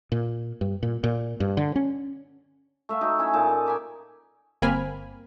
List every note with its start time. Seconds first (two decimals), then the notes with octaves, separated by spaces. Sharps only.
0.12 A#2
0.61 G2
0.83 A#2
1.04 A#2
1.40 G2
1.57 D3
1.76 C#4
2.89 A3 E5 F5
3.01 F#3 D#4
3.19 C#4 E4
3.33 A#2 D#4 A4 A5
3.49 D#5
3.66 G#5 B5 D6
4.62 G1 A#3 C4 G#5 B5 F6